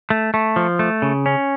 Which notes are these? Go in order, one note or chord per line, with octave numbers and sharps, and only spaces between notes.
A3
A3
F3
A3
C#3
C#4